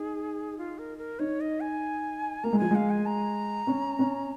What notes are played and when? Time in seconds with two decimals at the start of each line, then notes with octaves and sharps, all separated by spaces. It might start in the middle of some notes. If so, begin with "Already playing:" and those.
Already playing: D#4 G#4
0.58 F4
0.78 A#4
0.98 A#4
1.19 D#4 C#5
1.41 D#5
1.60 G#5
2.44 A#3 A#5
2.53 G#3
2.59 F3 G#5
2.71 G#3 F5
2.90 G#5
3.06 A#5
3.67 C#4
3.99 C#4